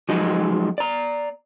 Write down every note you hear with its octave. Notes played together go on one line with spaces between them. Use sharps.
F3 F#3 G#3 D#4
D5 A#5